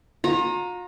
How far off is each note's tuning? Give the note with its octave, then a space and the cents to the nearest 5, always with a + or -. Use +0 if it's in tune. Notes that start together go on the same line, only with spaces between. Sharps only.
F4 +45 A#5 +0